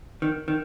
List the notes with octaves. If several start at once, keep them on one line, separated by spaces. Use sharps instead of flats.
D#3
D#3